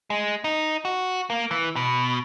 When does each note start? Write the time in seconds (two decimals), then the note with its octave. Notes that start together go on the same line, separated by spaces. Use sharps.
0.10 G#3
0.44 D#4
0.85 F#4
1.30 A#3
1.51 E3
1.76 B2